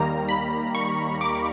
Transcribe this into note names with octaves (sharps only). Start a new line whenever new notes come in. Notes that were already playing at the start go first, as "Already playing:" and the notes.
Already playing: D#2 D#3 G3 A#3 A#5
B5
C#6
D6